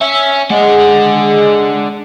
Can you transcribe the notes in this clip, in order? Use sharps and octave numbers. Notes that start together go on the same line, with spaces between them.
C#4 E5
G#3 D4 F#5